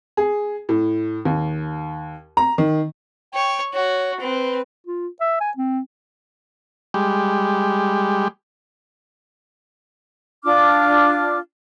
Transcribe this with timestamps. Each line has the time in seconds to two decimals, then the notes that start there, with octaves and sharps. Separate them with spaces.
0.17 G#4
0.69 A2
1.25 D#2
2.37 A#5
2.58 D#3
3.34 C#5 G5
3.74 F#4 C#5
4.20 C4 B4
4.87 F4
5.21 E5
5.41 G#5
5.57 C4
6.94 G3 G#3 G4
10.44 D4 F4 D6 F6